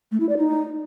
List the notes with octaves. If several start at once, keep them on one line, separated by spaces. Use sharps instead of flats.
A3
E4
D5
D#4